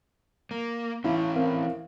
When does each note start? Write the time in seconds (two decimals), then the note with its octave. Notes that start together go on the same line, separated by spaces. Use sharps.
0.51 A#3
1.04 E3 C#4 E4 F5
1.36 C4 A#4 F5